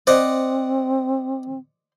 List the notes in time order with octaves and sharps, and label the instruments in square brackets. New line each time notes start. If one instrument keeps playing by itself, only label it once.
[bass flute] C4 [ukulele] C5 [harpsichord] D5 D#5 F#5